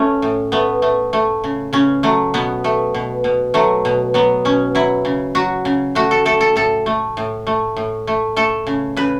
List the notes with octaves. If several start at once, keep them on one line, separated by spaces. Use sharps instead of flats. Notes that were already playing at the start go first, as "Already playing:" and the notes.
Already playing: A3 C#4
A2
A3 B3
A3
A3
C#3
C#3 C#4
F#3 A3
B2 B3
A3
B2
B2
F#3 A3
B2
F#3 B3
B2 C#4
F#3 E4
C#3
F#3 F#4
C#3
A3 F#4
A4
A3 A4
A4
A2 A4
A3
A2
A3
A2
A3
A3 A4
C#3
C#3 B4